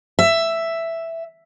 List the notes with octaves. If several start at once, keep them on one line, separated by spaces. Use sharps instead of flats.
E5